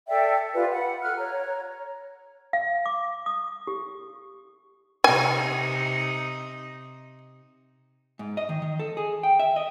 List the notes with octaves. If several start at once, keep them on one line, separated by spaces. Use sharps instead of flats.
A4 D5 E5 G5
F4 G4 B4 D5
F#5 B5
A4 F6 F#6
C#5 A#5
F5
D6
D#6
G4
C3 D#4 G#5
G#2
D#5
D#3
D#3
A4
G#4
G5
E5
D#5